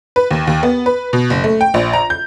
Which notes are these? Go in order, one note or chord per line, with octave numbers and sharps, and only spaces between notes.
B4
D#2
D#2
B3
B4
B2
F#1
A3
G5
A#1
A#5
G6